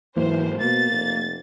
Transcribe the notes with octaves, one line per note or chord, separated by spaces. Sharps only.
G#2 E3 F#3 A#3 C5
B2 A#3 A6
F1